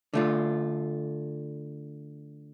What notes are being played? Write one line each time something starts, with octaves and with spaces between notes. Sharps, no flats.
D3 A3 F4